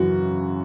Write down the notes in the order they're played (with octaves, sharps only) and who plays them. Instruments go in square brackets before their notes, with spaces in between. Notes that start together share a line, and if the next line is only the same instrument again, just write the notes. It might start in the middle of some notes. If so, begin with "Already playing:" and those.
Already playing: [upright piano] F#2 C#3 E3 F#4